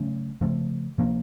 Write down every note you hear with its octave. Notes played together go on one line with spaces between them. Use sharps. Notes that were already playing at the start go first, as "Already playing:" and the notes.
Already playing: C#3 F#3 A3 C#4
C#3 F3 A3
C3 F3 A#3